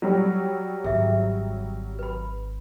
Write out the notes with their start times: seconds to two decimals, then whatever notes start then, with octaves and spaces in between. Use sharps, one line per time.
0.02 F#3 G3
0.84 G#1 G#4 E5
1.99 B4 B5